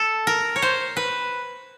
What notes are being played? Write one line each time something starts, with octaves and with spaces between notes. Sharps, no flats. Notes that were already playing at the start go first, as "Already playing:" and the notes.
Already playing: A4
A#4
C#5
C5
B4